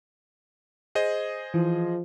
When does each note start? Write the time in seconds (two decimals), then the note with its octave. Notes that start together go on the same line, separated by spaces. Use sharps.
0.95 G#4 C5 D#5
1.54 E3 F3